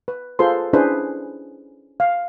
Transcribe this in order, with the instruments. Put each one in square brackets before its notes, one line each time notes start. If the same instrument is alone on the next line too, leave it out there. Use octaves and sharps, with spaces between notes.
[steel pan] B4
F4 G#4 A4 B4 C5 C6
C#4 D4 E4 G#4 B4 C5
F5